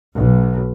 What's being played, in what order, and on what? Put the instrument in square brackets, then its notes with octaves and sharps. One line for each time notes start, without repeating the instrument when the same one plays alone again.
[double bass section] B1